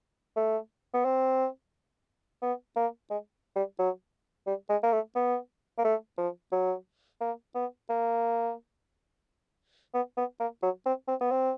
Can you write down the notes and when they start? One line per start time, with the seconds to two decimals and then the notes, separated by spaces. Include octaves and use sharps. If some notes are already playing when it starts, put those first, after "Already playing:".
0.37 A3
0.94 B3
1.05 C4
2.42 B3
2.76 A#3
3.10 G#3
3.56 G3
3.79 F#3
4.47 G3
4.70 G#3
4.83 A#3
4.93 A3
5.15 B3
5.78 A#3
5.85 A3
6.18 F3
6.52 F#3
7.21 A#3
7.55 B3
7.90 A#3
9.94 B3
10.17 B3
10.40 A#3
10.63 F#3
10.86 C4
11.08 C4
11.21 B3
11.31 C4